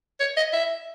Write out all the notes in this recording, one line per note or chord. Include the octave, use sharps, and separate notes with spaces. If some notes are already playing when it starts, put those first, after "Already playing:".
C#5
D#5
E5